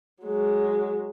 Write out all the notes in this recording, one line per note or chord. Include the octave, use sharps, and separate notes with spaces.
F#3 G#3